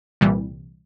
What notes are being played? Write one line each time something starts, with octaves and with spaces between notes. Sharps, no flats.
C2 A#2 E3 G3